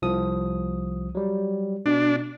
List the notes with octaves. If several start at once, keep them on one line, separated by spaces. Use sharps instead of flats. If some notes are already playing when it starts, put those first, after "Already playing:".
C2 F3 D#6
F#3 G3
B2 D4